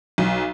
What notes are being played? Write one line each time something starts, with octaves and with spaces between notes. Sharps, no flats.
B1